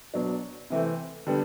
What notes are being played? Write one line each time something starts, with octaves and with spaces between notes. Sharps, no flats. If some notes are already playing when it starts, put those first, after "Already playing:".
B2 F#3 B3 D4
C3 E3 A3 C4
D3 G3 B3